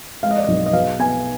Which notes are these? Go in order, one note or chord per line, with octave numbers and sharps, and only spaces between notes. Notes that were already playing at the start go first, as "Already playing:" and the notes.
G#3 F5
D#5
D5
B1 D#5
D#5
B2 F5
B3 G#5